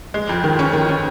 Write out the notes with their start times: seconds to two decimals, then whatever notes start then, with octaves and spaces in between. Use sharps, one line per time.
0.14 G#3
0.29 F2
0.44 D#3
0.59 C#4
0.73 D#3
0.89 C#4